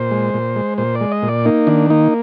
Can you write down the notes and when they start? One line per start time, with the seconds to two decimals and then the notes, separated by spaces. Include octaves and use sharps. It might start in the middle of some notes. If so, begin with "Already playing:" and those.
Already playing: A#2 C5
0.11 G#3
0.34 A#2
0.56 G#3
0.78 A#2 C5
0.95 D5
1.01 G#3
1.11 D#5
1.22 A#2
1.28 D5
1.45 A#3 D#4
1.67 D#3 D4
1.90 A#3 D#4